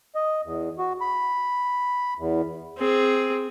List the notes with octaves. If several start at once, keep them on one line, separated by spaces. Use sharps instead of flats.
D#5
E2
F#4
B5
E2
C4 G#4